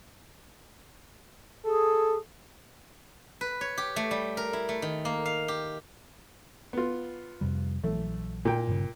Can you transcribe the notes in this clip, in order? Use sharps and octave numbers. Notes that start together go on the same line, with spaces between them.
G#4 A4
B4
C#5
G4
A3
G3
A#4
E4
A3
D#3
A#3
F5
G4
B3 F4
F2 C3 G3
A#1 E3 F#3 A3
A#2 G5
G1 G2 C#3